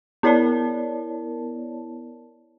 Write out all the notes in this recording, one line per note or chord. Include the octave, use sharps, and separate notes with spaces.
B3 E4 A#4 C#5 D5 A5